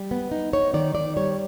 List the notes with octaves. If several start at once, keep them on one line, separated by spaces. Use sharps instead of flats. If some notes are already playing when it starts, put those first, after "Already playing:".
Already playing: G3
B3
D#4
D#4 C#5
D#3 D5
D#3 D5
G3 C#5